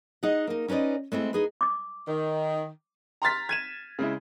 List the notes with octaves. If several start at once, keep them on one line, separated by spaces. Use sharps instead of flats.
D#4 G#4 D#5 F#5
A#3 D#4
C#4 D#4 B4 D5 D#5
G#3 A3 C4 E4
D#4 G#4 B4
D6 D#6
D#3
A#5 C6 F6 A6 B6
G#6 D#7 E7
C#3 G#3 E4